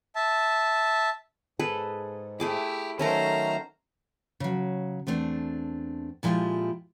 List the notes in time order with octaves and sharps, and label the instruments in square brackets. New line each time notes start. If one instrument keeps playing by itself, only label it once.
[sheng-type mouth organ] E5 A5
[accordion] G#2 [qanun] G#4 A4 B4
[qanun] A3 G#4 D6 [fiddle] E4 G4
[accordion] D#3 F#3 A3 [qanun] C#4 A4 A#4 [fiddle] C5 A#5
[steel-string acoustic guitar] C#3 F#3
E2 A3 C4 D4
A#2 F3 G#3 E4 F4 G4